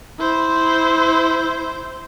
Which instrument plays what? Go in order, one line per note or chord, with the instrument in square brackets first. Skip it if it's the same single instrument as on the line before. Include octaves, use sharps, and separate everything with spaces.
[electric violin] E4 C5